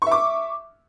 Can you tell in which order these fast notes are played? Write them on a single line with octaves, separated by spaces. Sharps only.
C#6 E5 D6